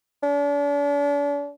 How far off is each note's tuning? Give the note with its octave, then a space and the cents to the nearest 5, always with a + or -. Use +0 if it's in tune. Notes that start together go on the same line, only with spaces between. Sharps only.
D4 -40